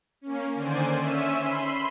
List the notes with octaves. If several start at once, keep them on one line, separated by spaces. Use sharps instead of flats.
A#3 C#4
D3 D#3 C5 D5 G#5 D#7
C#4 E5 E6 D#7
B5 C6